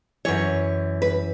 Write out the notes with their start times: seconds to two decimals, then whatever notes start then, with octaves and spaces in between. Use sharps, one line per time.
0.25 F#2 E3 C#5
1.02 B4